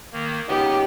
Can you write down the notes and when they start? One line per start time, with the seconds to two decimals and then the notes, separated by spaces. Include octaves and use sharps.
0.13 D#3 A#3
0.48 C#2 B3 D#4 G4